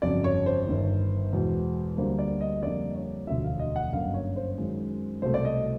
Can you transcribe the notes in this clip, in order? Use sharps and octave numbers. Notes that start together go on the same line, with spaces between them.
G1 F2 C#3 F#3 D5
C#5
C5
G1 G2 D#3
E2 B2 G#3
D2 D3 G3 A#3 C5
D5
D#5
F2 D3 G3 A#3 D5
C#5
E1 D2 D3 F3 E5
F5
D#5
F#5
G1 F#2 D3 F#3 A#3 F5
C#5
C5
F#2 D#3 G#3
C2 B2 F#3 A3 C5
D5
D#5